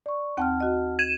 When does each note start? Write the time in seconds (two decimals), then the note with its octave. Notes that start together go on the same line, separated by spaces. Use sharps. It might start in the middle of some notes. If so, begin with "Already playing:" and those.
0.06 D5 C#6
0.37 D#2 C4 F#5 G5 A5 F6
0.60 F#4 D#5
0.99 G#6 D#7 E7